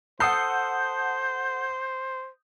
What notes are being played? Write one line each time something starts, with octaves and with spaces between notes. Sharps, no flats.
A4 C5 F#5 D#6 G6 C7